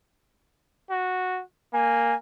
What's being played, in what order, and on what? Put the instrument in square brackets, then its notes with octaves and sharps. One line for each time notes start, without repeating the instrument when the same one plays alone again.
[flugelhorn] F#4
[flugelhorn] A#3 [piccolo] G#5